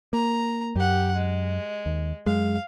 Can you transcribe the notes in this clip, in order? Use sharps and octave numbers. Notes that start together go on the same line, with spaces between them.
A#3 A#5
F#2 G4 F#5
G#3
D#2
F#2 G#3 F5